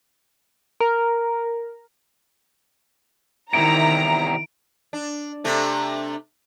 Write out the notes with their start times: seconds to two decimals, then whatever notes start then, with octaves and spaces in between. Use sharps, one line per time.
0.80 A#4
3.53 E2 C3 D#3 E4 A#5 D7
4.93 D4
5.44 C3 A3 D4